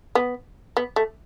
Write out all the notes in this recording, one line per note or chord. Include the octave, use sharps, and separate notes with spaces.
B3
B3
A3